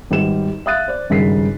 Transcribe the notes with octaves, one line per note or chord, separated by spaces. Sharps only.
G#1 G3 B4 E7
E5 F5 D#6 F#6 A6 D#7
C5 D5
G#1 G2 C#3 A#4 B6 C7